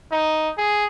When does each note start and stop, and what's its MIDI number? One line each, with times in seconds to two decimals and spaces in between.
0.12 0.50 63
0.58 0.86 68